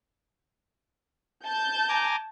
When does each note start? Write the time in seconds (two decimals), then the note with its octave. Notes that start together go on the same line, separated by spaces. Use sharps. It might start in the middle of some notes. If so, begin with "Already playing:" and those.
1.46 A5 G6
1.89 G#5 A#5 D6